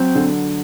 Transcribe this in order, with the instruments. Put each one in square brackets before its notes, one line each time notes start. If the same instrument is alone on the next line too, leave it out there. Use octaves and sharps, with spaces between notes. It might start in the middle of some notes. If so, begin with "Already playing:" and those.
Already playing: [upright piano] F#3 [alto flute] C4
[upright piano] D3